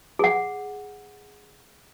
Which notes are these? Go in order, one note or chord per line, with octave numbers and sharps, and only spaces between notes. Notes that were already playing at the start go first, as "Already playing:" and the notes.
G#4 F#5